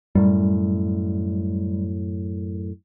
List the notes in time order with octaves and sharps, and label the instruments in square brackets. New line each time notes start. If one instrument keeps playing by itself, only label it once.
[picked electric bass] F#2 A2 [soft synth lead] G3